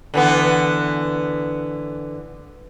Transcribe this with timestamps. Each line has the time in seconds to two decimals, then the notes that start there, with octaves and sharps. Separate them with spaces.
0.14 D3 E3 B3